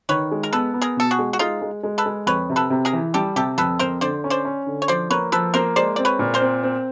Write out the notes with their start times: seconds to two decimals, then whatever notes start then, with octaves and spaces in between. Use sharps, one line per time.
0.09 D#3 B4 C#5
0.31 G#3
0.43 A#4
0.53 B3 A4 B4
0.74 B3
0.82 G#4 A#4
0.97 B2 A4
1.11 F#4 G#4
1.19 G#3
1.33 F#4
1.39 G#3 D#4 F4
1.62 G#3
1.83 G#3
1.98 A4 B4
2.06 G#3
2.27 F2 B4 C#5
2.50 C3
2.56 A4 B4
2.70 C3
2.85 G#4 A#4
2.93 E3
3.14 G3 G4 A4
3.36 C3 G4 A4
3.58 F2 A4 B4
3.79 F2 A#4 C5
4.01 D3 C5 D5
4.24 C#4
4.30 C5 D5
4.45 C#4
4.66 D3
4.82 C#5
4.88 F3 C5 D5
5.10 A#3 B4 C#5
5.32 F3 A4 B4
5.54 A#3 A#4 C5
5.76 G#3 C5 D5
5.96 C4 D5
6.05 B4 C#5
6.19 A#2
6.34 A#4 C5
6.41 C4
6.63 C4